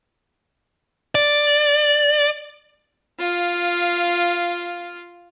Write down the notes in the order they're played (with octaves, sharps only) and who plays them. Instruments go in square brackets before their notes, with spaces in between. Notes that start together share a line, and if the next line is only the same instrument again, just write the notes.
[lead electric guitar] D5
[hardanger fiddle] F4 F5